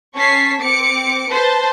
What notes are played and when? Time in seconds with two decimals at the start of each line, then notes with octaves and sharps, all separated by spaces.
0.16 C#4 A5 C#6 B6 C7
0.60 C4 D6 C#7
1.29 B4 C5 A5